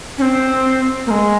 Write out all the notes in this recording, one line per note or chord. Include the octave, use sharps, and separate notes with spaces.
C#4
C4
A#3
G#3